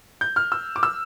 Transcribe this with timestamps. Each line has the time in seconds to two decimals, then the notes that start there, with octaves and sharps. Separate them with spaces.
0.21 G6
0.36 F6
0.52 E6
0.76 D6
0.83 E6